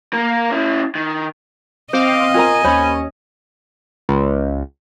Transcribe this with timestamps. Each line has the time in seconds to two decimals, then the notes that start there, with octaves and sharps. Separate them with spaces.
0.13 A#3 A#4
0.51 C#4 E4
0.95 D#3
1.93 C4 C5 D#5 F5 D6
2.34 F4 A#4 G#5 A#5
2.64 D#2 C#4 C5 C#5 B5
4.09 C#2